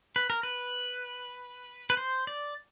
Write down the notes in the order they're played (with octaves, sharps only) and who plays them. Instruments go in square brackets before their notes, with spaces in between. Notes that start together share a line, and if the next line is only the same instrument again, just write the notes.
[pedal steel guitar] B4
A#4
B4
B4
C5
D5